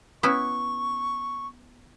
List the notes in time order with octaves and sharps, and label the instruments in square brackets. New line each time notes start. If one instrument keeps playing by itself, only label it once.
[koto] B3 C#4 E4 [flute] C#6